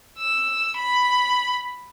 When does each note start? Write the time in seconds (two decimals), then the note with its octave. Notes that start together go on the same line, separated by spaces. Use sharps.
0.18 E6
0.77 B5